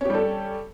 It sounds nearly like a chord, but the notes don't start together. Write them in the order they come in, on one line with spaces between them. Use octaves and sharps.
C#4 G4 G3 A4